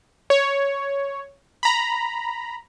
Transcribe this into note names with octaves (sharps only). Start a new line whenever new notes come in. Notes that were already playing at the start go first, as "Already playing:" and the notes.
C#5
A#5 B5